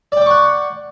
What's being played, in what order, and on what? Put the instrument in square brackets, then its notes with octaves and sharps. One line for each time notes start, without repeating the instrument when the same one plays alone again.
[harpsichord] D5
G5
D6
C#6
F#5